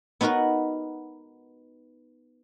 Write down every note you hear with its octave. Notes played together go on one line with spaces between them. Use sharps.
B3 D#4 F#4 A#4 B4